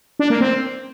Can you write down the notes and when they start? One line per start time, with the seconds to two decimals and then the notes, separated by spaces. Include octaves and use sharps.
0.19 D4
0.30 A#3
0.41 C4